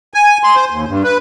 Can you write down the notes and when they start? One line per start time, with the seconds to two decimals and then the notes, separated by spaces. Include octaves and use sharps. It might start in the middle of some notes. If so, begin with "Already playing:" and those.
0.14 G#5
0.44 C6
0.56 C5
0.70 D#2
0.87 G2
1.04 B4